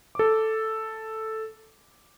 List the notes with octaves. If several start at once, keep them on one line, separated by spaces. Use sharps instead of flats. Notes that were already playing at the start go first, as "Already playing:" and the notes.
A4 D6